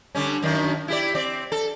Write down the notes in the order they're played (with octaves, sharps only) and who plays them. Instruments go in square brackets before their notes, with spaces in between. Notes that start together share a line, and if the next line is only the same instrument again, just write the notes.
[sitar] D3 G3 C#4
F#2 D#3 D4
E4 G4 D5
C4 D5
A4